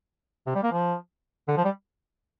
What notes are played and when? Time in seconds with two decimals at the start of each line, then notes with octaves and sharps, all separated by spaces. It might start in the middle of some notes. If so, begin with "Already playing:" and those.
0.47 C3
0.55 G3
0.63 A#3
0.72 F3
1.48 D3
1.57 F3
1.65 G3